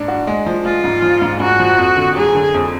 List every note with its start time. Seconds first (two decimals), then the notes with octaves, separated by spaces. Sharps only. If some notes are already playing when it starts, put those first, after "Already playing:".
Already playing: G#2 D4
0.08 F#4
0.27 G#3
0.46 F3
0.65 G#3 F4
0.84 G#2
1.02 F3
1.22 G#2
1.40 G#2 F#4
1.60 F3
1.78 F2
1.97 D3
2.16 F#3 G#4
2.35 D3
2.54 F2